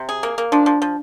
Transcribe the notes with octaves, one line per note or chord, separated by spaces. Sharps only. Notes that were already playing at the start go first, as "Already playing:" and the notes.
Already playing: C3
G#4
A#3
A#3
F3 D4
F3
F3